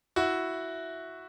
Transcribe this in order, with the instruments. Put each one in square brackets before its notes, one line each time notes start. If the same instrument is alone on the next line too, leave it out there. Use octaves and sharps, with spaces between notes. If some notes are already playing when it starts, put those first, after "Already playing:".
[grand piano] E4 F#4